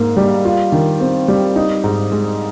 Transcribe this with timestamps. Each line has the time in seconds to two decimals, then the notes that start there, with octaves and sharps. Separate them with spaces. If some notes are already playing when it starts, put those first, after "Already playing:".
Already playing: G#2 A#3
0.17 G3
0.45 F4
0.72 D#3
1.00 C4
1.28 G3
1.56 D#4
1.84 G#2
2.12 G#3